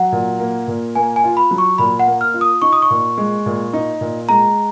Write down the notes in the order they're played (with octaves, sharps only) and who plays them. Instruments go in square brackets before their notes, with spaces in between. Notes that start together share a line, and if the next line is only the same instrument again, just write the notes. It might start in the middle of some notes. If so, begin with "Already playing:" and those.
Already playing: [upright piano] F#3 [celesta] F#5
[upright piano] A#2
A#3
A#2
[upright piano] A#3 [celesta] G#5
[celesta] G#5
[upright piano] F4
[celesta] B5
[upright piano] F#3
[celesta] C#6
[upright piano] A#2 [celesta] B5
[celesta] F#5
[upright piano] A#3
[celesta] F6
[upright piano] F4
[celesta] D#6
[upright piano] D#4 [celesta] C#6
[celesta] D#6
C#6
[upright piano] A#2
G#3
A#2
D#4
A#2
[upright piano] G#3 [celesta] A#5